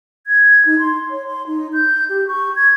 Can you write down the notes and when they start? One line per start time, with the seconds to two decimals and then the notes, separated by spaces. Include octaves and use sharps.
0.27 G#6
0.66 D#4
0.79 C6
1.10 C#5
1.27 C6
1.47 D#4
1.73 G6
2.09 G4
2.27 C#6
2.56 G#6